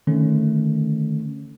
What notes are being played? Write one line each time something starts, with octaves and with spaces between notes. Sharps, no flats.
D3 D#3 A3 C#4 D4